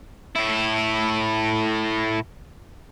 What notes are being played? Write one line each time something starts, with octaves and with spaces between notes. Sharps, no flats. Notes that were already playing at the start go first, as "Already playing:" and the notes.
A2 E4